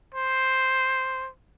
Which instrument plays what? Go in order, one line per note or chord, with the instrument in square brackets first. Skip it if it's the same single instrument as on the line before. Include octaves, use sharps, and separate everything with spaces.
[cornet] C5